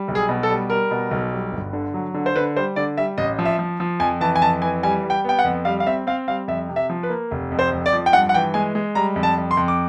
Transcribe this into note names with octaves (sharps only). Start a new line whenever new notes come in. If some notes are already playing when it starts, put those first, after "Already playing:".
Already playing: G3
B1
G#4
B2
A4
G3
G3 A#4
B2
B1
G3
G1
D3
F#3
D3
C5
D3 B4
G3 C5
D3 D5
G3 E5
A1 D#5
F3
E5
F3
F3
F2 G#5
E3 A5
G#5
F2 A5
E3 G#5
G3 G#5
G3
G5
B3 G5
F#5
F2
G3 F5
F5
C4 E5
C4 F5
G3 F5
F2 E5
C3
E5
F3
B4
A#3
F1
F2
C5
F2
D5
F3
G5
G2 F#5
F#5
E3 G5
G#3 G#5
G#3
G3 A#5
F2
A5
F2
C6
F2
D6